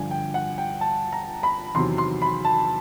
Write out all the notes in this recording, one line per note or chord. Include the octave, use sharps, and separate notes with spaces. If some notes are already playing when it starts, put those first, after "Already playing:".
Already playing: G2 D3 F3 G#5
G5
F#5
G5
A5
A#5
B5
E2 C3 D#3 F#3 C6
C6
B5
A5